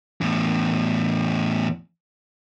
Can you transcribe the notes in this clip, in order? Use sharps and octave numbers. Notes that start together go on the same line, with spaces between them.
E2 A2